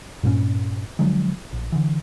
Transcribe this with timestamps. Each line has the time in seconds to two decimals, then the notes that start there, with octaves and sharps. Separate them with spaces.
0.23 G2 A#2 C#4
0.99 D3 F3 F#3 G#3
1.53 A#1
1.72 D3 E3